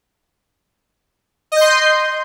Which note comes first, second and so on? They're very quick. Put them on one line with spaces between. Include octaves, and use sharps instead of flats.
D#5 G6 C6